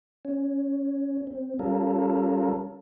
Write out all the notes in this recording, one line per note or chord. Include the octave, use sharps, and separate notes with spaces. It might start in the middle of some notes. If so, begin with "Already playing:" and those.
C#4
C4
G3 C#4 F4 A4 A#4